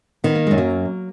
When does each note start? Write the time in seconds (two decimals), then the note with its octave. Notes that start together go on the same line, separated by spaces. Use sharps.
0.24 D#3 B3
0.35 A#3
0.47 F#2 G#3
0.58 F#3 A#3